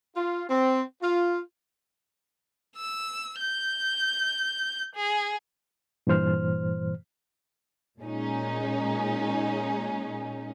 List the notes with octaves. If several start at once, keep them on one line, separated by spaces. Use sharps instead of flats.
F4
C4
F4
E6
G6
G#4
G2 A#2 E3 C5 F6
A#2 G#3 C#4 D#4